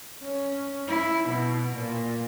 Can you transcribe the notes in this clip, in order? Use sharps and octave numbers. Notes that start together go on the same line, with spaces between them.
C#4
E4
B2
A#2